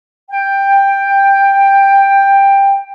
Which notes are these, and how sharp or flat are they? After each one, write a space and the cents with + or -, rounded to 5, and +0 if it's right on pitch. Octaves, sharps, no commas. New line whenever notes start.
G5 +10